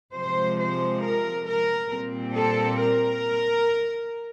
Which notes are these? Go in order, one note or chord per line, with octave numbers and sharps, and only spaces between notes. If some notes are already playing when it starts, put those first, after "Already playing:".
C3 F3 G#3 C5
C5
A#4
A#4
A#2 G3 C4
A4
A#4